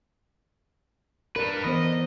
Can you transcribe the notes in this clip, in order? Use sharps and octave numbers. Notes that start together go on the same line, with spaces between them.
D4 A#4 B4 D5
E3 B3 C5 D#5